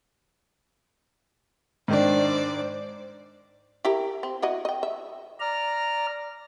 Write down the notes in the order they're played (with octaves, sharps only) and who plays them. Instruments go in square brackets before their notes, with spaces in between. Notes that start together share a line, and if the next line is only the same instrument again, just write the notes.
[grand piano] G#2 D#3 D4 [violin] C5 D5
[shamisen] E4 G4 A#4
C4
E4 F#4 D#5
D#5 G5
E5
[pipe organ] D5 A#5 F6